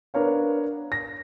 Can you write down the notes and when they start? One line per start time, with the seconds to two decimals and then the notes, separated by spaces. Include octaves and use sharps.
0.14 B3 D4 A#4 C#5 F5
0.92 A#6